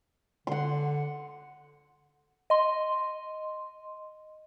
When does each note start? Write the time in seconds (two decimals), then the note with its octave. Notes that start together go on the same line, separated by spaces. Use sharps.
0.47 D3 F#5 C6
2.50 D#5 C6